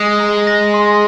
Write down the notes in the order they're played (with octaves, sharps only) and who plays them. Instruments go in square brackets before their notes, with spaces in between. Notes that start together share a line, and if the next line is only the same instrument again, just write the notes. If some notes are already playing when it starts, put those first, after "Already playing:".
Already playing: [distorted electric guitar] G#3 [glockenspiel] D#6
[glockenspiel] A#5
A#6
C6